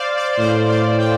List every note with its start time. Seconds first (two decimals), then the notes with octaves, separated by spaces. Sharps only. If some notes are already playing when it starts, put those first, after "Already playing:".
Already playing: C5 D5 F5
0.17 D5
0.39 A2 C5
0.68 D5
0.98 G5